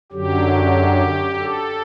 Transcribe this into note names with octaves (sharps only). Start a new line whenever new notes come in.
F#2 D3 F#3 G4
A4